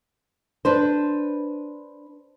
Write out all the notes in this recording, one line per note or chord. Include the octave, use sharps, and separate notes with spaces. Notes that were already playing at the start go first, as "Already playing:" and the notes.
D4 B4 C5